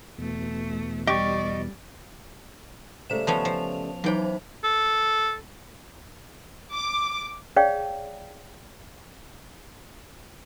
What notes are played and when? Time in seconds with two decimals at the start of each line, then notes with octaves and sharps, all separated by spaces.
0.18 E2 B2 A3
1.07 G3 G4 D5 D#5 C#6
3.10 C#3 G3 A3 C5 E7
3.27 F3 B3 C#4 A5 F7
3.45 F3
4.04 E3 F#3 D#4 C5 G5
4.64 A4
6.73 D6
7.56 G#4 C#5 D5 F5 G5